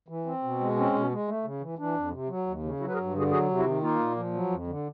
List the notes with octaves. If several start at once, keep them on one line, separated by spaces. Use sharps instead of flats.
E3
C4
B2
G#3
C4 C#4
B2
G#3
A3
C#3
E3
E3 D4
F2
C3
F#3
D#2
C#3
F#3 E4 F#4
B4
G#4 A#4
G2
D3 F#4 G#4
F#3 F#4 G#4
C3
E4 F#4
D#3
A#3 D#4 F4
A#2
F3
F#3
F2
D3